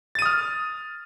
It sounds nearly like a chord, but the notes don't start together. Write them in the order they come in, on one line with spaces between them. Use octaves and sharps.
A6 D#7 D#6 F6